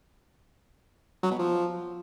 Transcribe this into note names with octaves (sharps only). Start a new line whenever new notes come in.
F#3
B2
F3